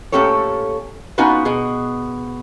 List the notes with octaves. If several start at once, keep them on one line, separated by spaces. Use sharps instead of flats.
A#2 A3 C#4 G4 A4 C#5
B3 C#4 D#4 F4 F#4 B4
B2 G#4